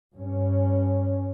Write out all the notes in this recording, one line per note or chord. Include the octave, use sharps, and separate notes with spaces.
G2 C#4